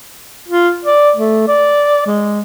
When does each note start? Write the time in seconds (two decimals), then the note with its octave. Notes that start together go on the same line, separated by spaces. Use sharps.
0.49 F4
0.85 D5
1.16 A3
1.48 D5
2.06 G#3